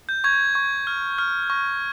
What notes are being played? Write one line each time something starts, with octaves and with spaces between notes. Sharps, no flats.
G6
C#6 G#6
C#6
F6
F6
C#6